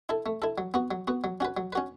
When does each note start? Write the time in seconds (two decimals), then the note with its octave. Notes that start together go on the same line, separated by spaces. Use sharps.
0.09 E4 A4
0.26 A3
0.42 E4 A4
0.58 F#3
0.74 B3 F#4
0.91 F#3
1.07 B3 F#4
1.24 F#3
1.40 C#4 F#4 B4
1.57 F#3
1.73 C#4 F#4 B4